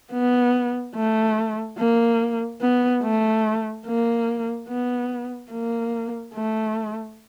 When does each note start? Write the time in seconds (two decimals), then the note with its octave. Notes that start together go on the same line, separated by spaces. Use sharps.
0.12 B3
0.95 A3
1.78 A#3
2.61 B3
3.03 A3
3.86 A#3
4.69 B3
5.52 A#3
6.34 A3